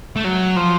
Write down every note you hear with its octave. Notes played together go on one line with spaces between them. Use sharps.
A3
F#3
F3